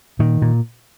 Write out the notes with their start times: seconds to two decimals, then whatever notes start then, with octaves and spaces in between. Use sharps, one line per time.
0.19 A#2 D#3
0.42 A#2